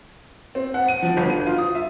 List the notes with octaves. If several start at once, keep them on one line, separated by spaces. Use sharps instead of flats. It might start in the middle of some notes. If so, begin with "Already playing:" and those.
C4
F#5
D#7
F3
G1
D#7
F4
D#6
E5